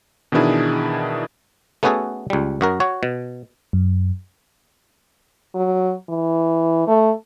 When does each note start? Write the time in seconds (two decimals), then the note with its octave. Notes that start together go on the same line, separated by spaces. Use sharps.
0.32 B2 D#3 E3 D4 E4 G#4
1.83 A3 B3 C#4 F#4 G#4 A4
2.30 C#2 G3
2.61 F#2 F#4 A#4
2.80 F#4 C#5
3.03 B2
3.73 F#2
5.55 F#3
6.09 E3
6.87 A3